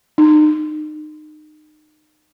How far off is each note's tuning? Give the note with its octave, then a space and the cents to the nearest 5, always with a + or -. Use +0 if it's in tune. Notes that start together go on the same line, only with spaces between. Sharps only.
D#4 -30